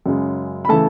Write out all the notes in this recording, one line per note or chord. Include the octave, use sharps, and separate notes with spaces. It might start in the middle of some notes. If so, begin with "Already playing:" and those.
F#2 C#3 G#3
B5
C#3 E3 A3 A4 A5